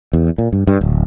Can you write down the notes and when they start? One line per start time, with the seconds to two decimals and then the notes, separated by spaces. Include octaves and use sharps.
0.13 E2
0.38 A#2
0.53 G2
0.67 G2
0.81 D1